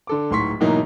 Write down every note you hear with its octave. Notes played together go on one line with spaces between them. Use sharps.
D3 A4 D6
D1 G#2 C6 C#6 B6
G#2 B2 E3 F#3 A#3 D#4